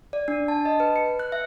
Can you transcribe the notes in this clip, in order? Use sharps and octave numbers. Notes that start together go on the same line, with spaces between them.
D5
D4
A5
D#5
B4
C#7
F#6
E5